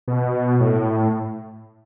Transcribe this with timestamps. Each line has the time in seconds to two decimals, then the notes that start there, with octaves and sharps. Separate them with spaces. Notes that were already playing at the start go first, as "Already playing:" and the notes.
0.08 B2
0.60 A2